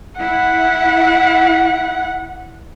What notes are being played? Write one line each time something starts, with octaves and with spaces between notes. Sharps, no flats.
E4 F#5